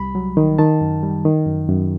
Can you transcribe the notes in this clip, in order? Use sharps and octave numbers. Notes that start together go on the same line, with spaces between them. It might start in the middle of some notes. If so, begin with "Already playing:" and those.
Already playing: C2 G3 B5
F#3
D#3
D#3 A5
F#2
G3
D#3
F#2
F#2